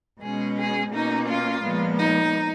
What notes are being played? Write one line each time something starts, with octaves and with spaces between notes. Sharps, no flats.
B2 G#3 C#4 G#4
G#4
B2 A#3 C#4 D#4
F4
A#2 F3 G#3 B3
D#4